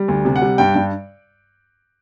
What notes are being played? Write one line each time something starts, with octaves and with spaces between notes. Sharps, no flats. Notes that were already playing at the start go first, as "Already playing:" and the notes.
Already playing: G3
D2
C3
F#5
G3
G2 G5
G2